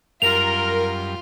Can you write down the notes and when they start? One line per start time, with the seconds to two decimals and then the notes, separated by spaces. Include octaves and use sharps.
0.22 F#2 G3 F4 A#4 F7